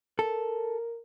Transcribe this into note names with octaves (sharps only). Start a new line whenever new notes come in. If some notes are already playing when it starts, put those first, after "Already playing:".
A4 A#4